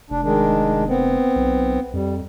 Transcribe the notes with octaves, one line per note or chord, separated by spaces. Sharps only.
F1 D4
D#3 G#3 D4
B3 C4
B1
F2 G3